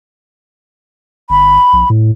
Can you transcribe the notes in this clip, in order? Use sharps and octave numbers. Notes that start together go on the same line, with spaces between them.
G1 B5
A#1
A2